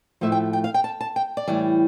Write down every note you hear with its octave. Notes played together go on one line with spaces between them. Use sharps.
A2 F3 A3 E5
G5
G5
F5
G5
A5
A5
G5
D5
A2 E3 G3